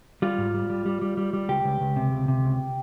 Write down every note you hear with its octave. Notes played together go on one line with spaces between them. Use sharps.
G3 F4
G#2
G3
G3
G3
G3
G3
G3
C#2 G4
C#2
C#2
C3
C#2
C3
C#2